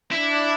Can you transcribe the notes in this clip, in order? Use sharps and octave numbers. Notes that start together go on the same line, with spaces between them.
D4 E4